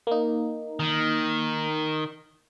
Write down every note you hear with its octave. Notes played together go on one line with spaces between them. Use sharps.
A#3 D#4
D#3